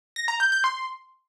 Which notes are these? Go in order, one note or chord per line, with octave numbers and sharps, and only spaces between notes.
A#6
A#5
G6
G6
C6